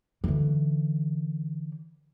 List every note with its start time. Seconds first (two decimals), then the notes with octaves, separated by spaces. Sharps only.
0.24 D3 E3